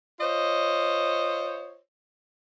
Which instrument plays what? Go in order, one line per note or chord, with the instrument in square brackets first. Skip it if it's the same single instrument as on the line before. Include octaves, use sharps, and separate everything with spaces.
[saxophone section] F4 C5 C#5 D#5